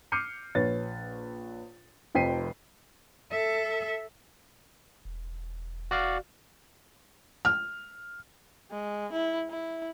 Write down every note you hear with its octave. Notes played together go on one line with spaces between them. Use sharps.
D6 F6 G6 C7 C#7 D#7
A#1 B4 C#5 A6
F1 F2 G5 B6 C7 D#7
A4 E5
E1
F#4 D5 F5
F6
G#3
E4
E4